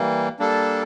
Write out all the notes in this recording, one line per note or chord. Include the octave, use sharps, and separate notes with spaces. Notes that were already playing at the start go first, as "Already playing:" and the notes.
Already playing: E3 G3 A#3
G3 A#3 D4 A4